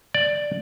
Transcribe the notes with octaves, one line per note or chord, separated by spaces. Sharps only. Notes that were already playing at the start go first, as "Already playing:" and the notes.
D5